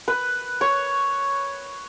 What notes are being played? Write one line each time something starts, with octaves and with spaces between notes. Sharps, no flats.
B4
C#5